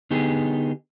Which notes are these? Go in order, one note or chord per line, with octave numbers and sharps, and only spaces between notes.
D3 B3 D#4 G4 G#4